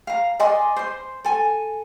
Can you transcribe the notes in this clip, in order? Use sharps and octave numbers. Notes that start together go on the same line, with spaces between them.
F5 A#5
D5 D#5 G#5 C6
C5 C6
A4 G#5